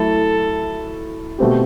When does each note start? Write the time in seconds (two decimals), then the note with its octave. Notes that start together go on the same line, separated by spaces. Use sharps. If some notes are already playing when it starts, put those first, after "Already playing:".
Already playing: F#3 A3 E4 A4
1.38 B2 A3 C4 G4